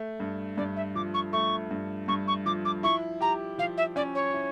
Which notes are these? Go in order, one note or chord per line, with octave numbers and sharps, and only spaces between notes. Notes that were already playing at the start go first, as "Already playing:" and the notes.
Already playing: A3
G2
G2 D5
E5
F3 D6
C#6
A3 C#6
G2
G2 C#6
C#6
F3 D6
D6
E4 C#6
G4 A#5
F3 F5
E5
C#4 D5
C#5
E4